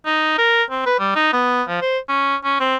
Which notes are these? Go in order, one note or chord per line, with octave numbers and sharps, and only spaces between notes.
D#4
A#4
C4
B4
G3
D#4
B3
F3
C5
C#4
C#4
C4